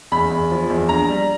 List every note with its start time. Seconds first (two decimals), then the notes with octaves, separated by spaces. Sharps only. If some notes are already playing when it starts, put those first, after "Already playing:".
0.12 E2 B5
0.30 E2
0.51 F3
0.70 E2
0.89 A#1 A#5
1.08 G3